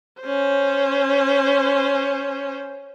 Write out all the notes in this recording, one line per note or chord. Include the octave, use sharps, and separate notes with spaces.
C#4 C5